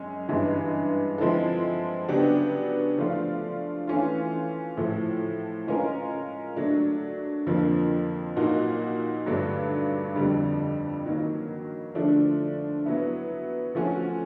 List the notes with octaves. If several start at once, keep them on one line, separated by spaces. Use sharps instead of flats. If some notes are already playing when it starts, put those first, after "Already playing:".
Already playing: F#2 G#3 C#4
G2 E3 G#3 C#4 E4
F3 G#3 C4 E4 A4
C#3 F#3 B3 D4 G4
F3 A3 D4 F4
E3 A3 C#4 F4
A2 F3 A3
G#3 C#4 F4 A#4
F#3 A3 D4
F2 D3 F3 A#3
A#2 F#3 A#3 D#4 F#4
G2 D3 F#3 A3 D4
F2 D3 G3
D#3 F#3 A#3
D3 F3 A3 D4
F#3 B3 E4
F3 A3 C#4 F#4